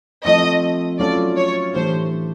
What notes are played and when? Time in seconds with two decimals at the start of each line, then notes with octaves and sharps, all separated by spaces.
0.24 F3 A3 C4 D#5
0.99 F#3 A3 C#4 F4 A4 D5
1.37 C#5
1.74 A2 E3 A3 D4 G4 C5